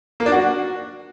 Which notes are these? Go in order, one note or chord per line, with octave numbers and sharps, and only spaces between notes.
A#3
D4
F#4